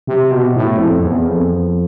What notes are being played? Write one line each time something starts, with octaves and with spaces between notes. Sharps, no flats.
C3
B2
A2
F2
E2
F2